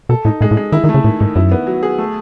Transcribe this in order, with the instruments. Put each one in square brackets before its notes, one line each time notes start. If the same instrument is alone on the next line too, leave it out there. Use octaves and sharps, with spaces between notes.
[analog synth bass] B2 [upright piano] A4
[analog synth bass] A2 [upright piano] D#4
[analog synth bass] A2 [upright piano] G#3
[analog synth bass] A2
[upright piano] G#3
[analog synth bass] D#3 [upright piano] E4
[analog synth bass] D#3
[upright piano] A3
[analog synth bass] C#3
[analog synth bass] A2 [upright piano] D#3
[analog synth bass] G#2 [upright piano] D#3
[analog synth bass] F#2 [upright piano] E4
[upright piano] B3
F#3
G#4
A3